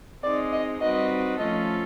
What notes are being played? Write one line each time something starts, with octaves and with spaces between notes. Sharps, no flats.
G#3 C4 D#4 D5
D#5
G3 C4 D#4 F#4 B4 D#5
F3 A3 C#4 F4 A4 D#5